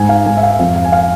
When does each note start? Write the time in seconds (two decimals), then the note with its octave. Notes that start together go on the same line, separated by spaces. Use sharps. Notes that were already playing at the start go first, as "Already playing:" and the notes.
Already playing: G#2 G#5
0.09 F5
0.26 G#2 G#5
0.37 E5
0.43 F5
0.59 F2 F5
0.76 F5
0.84 G#5
0.92 F5